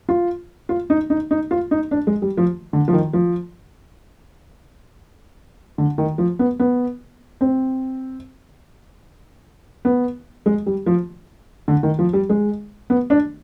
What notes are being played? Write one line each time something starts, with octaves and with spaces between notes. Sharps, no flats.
F4
F4
D#4
D#4
D#4
F4
D#4
D4
G#3
G3
F3
D3
F3
D#3
F3
D3
D#3
F3
B3
B3
C4
B3
G#3
G3
F3
D3
D#3
F3
G3
G#3
B3
D4